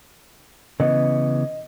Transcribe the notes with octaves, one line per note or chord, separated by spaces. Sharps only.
C#3 E3 B3 D#5